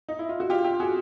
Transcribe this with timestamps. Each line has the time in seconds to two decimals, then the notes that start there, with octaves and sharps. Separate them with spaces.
0.09 D#4
0.19 E4
0.29 F4
0.40 F#4
0.50 F4 G4
0.64 F4 G4
0.80 F#4 G#4